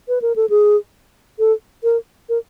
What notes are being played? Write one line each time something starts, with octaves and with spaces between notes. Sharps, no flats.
B4
A#4
A4
G#4
A4
A#4
A#4